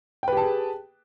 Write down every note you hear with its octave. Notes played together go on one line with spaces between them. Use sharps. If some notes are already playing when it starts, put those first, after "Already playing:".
G4 G#4 B4 G5 A5